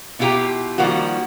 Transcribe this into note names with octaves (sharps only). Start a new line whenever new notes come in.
B2 E4 F4 G4 G5 A#5
D#3 F3 G3 A#3 F#4